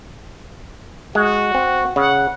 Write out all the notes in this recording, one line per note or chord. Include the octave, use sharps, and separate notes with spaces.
G#3 F#4
C4
C#3 F#5